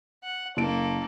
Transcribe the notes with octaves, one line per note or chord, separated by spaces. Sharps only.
F#5
F#1 A#3 A4 D7